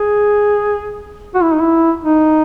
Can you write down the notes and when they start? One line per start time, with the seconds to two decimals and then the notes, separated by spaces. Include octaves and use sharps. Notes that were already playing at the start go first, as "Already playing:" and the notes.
Already playing: G#4
1.35 F#4
1.43 E4
1.52 D#4
1.60 E4
2.04 D#4